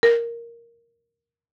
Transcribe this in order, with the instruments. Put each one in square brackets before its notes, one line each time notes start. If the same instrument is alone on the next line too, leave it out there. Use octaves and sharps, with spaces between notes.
[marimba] A#4